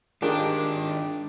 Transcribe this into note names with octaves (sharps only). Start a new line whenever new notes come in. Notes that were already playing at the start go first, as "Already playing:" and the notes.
D#3 G#3 D4 F4 G4 G#4 A#4